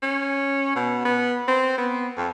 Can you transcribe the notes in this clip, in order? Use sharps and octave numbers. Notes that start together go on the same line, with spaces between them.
C#4
B2
B3
C4
B3
F2